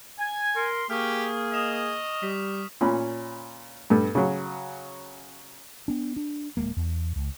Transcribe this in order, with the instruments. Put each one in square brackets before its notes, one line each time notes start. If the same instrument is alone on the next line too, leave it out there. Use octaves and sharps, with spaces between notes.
[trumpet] G#5 [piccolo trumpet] G#6
[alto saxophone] A#4 [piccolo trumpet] C6
[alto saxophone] A#3 [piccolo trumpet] G4 [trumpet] G#4 [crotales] C#6 D#6 F6
[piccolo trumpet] D#5 [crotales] D#6 E7 F7
[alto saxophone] G3 [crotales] B6
[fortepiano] A#2 C#4 B5
G2 A4
C#3 F#3
[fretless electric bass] B3 D4
D4
D1 D2 G#3 A#3
E2
C#2